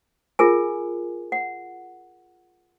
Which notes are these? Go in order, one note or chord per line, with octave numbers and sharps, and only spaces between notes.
F4 G#4 A#4 G#5
F#5